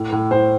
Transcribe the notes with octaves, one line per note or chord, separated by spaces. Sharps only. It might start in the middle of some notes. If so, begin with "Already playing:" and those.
Already playing: A2
A2
A2 C5